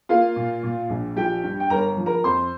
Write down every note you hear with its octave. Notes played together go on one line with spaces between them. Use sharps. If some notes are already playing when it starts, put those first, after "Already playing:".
A#3 F4 F5
A#2
A#2
A#1
F3 G4 G5
G2
G5
G1 A#4 A#5
F3
A#4 A#5
F2 C5 C6